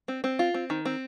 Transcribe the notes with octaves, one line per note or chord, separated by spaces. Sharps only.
C4
C4
F4
C4
D#3
C4